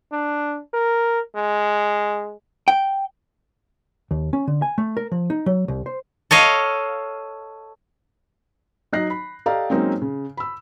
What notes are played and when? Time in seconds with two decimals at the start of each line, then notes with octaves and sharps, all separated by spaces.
0.12 D4
0.74 A#4
1.36 G#3
2.68 G5
4.11 D#2
4.33 C#4
4.47 D3
4.62 G#5
4.78 A3
4.97 A#4
5.12 F3
5.30 D#4
5.46 F#3
5.68 C2
5.86 C5
6.31 A4 C#5 D#5 F5
8.92 F#3 D#4 D#5 F#6 A#6 C7
9.10 B5
9.46 G4 A4 D5 D#5 F5 A#5
9.70 F#3 G#3 A#3 C4 C#4 D#4
10.02 C#3
10.37 B5 E6